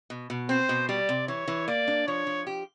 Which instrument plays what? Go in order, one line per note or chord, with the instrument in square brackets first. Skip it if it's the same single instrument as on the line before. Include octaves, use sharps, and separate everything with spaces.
[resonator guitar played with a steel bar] B2
B2
[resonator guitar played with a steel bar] C4 [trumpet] C5
[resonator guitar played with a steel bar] B2
[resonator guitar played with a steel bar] G3 [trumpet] D5
[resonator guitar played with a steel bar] C3
[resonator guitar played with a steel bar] E3 [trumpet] C#5
[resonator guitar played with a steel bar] E3
[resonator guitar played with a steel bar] A#3 [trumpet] D5
[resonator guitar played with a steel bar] D4
[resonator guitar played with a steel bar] F3 [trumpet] C#5
[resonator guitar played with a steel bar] F3
G4